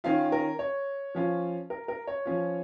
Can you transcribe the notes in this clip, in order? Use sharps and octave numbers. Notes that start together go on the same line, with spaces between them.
D#3 C#4 F4 F5
A#4
C#5
F3 C#4 F4
A#4
A#4
C#5
F3 C#4 F4